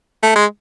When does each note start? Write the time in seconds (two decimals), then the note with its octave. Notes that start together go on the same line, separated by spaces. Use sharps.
0.23 A3
0.36 G#3